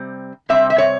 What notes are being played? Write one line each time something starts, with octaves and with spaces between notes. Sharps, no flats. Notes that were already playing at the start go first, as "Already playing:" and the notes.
Already playing: C3 G3 C4
C3 G3 C4 E5
E5
C#5